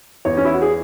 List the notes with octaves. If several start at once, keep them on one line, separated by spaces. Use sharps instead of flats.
E2 C#5
C#4
E4
F#4
G#4